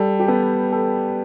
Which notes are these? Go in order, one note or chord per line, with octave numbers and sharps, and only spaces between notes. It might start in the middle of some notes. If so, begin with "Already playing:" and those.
Already playing: G3 A4
G4
B3 A4
A4